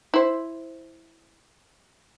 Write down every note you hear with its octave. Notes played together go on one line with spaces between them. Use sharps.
E4 C5